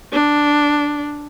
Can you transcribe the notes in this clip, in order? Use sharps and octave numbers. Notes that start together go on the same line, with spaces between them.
D4